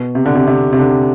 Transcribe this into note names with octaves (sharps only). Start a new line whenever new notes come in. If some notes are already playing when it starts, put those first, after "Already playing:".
Already playing: B2
C3
D3
C3
C3
C3
D3